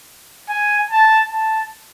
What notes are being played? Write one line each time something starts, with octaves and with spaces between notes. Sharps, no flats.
G#5
A5
A5